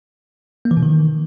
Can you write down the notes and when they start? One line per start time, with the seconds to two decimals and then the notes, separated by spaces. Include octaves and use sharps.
0.65 A#3
0.71 E3
0.77 B2
0.83 D#3